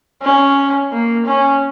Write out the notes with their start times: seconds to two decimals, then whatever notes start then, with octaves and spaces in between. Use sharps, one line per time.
0.22 C#4
0.92 A#3
1.26 C#4